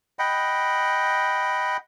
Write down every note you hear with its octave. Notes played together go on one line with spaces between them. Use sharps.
D#5 F#5 G5 B5